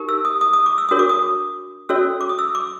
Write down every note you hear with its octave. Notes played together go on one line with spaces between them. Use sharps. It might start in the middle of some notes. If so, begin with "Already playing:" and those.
Already playing: D#4 G4 A#4
E6
D#6
D#6
D#6
D6
E6
D4 F#4 A#4 C#5 D#6
D6
D#6
C#4 F#4 A4 C#5 E6
D6
D#6
E6
D6